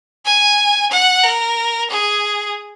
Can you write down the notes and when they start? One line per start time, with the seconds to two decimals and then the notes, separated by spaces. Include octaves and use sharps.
0.25 G#5
0.91 F#5
1.23 A#4
1.90 G#4